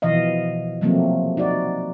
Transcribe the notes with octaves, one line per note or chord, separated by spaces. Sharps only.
B2 E3 F3 D#5 F5
C3 F3 F#3 A3 A#3 C4
D#4 F#4 D5